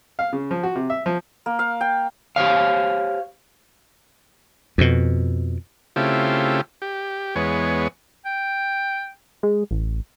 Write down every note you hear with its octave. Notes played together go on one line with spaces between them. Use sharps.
F5
C#3
F3
F#4
C3
E5
F3
A#3
F5
G5
G4 C5 C#5 F5
F2 B2
C#3 A3 C4 E4 F4 G4
G4
E2 G#3 B3 C#5
G5
G#3
A1